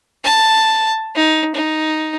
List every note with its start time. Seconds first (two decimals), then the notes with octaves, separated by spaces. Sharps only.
0.24 A5
1.15 D#4
1.55 D#4